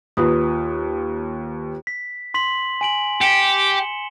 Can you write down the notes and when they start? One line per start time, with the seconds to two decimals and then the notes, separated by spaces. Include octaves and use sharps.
0.17 D#2 F4 B4 D#6
1.87 B6
2.34 C6 B6 F#7
2.81 G#5 D7 F#7
3.21 G4 C#7 E7 G7